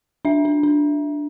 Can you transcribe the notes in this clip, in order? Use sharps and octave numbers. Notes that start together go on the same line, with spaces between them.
D4 E5
D4
D4